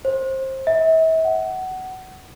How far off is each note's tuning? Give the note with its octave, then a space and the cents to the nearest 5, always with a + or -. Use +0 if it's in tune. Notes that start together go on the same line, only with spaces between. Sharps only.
C5 +20
E5 -40
F#5 +20